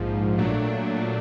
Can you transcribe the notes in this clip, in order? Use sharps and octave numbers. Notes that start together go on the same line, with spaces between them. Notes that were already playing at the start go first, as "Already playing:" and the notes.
Already playing: A#1 G#2 F3
A#2 F#3 A3 D4